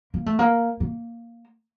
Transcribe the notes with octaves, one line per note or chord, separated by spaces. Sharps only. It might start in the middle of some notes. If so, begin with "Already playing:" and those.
A#3
A3
A#3
A#3